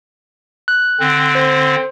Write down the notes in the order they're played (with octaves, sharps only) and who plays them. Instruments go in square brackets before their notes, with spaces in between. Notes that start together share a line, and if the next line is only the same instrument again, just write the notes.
[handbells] F#6
[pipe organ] D3 C4
[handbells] C5